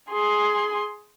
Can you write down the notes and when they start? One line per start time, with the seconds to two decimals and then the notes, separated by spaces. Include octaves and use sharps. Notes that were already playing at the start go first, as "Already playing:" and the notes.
0.11 G#4 C6